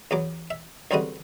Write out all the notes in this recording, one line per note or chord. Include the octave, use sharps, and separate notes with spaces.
E2 F#3 D6
E5
C#2 D3 G3 C4 F#4 D#5